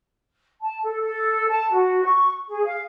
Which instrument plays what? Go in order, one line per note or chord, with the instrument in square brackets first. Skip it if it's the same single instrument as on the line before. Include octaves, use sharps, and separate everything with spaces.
[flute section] A5
A4
A4
A5
F#4
C#6
G#4
F5